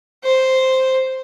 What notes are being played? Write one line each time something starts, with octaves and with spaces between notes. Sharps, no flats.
C5